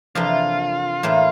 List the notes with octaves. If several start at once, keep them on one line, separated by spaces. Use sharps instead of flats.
F2 C3 E3 A#3 D4 F4
A2 E3 A#3